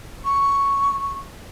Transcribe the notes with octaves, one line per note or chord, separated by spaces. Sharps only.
C#6